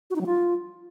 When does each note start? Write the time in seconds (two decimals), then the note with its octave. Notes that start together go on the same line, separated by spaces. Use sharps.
0.10 F#4
0.16 D#4
0.21 F#3
0.26 F4